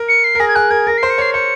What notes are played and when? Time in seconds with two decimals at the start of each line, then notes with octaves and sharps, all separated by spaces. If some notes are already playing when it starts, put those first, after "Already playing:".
Already playing: A#4
0.08 C#7
0.24 C7
0.35 A#4
0.40 G#4 A#6
0.48 G#6
0.55 G#4 F#6
0.70 A#4 G#6
0.87 A#4 A#6
0.98 C7
1.03 C5
1.10 C#7
1.18 C#5 C7
1.33 C5 C#7